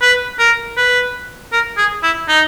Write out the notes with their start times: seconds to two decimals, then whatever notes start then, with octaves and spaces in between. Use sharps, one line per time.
0.02 B4
0.39 A#4
0.77 B4
1.52 A#4
1.77 G#4
2.03 E4
2.28 D#4